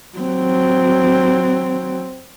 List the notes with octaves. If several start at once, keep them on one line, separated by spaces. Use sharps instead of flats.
F#3 C4